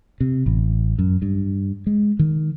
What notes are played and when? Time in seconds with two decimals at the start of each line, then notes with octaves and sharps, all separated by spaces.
0.20 C3
0.46 A1
0.99 F#2
1.22 G2
1.87 G#3
2.19 D#3